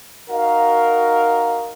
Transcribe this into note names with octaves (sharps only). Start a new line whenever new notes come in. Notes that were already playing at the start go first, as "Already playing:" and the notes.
D#4 F#4 A#4 D#5 F5